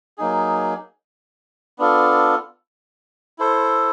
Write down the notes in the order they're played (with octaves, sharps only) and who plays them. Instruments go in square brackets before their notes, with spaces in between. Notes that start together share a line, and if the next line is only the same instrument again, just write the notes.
[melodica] F#3 A#3 D#4 G#4
B3 D4 F4 A4
E4 A4 C5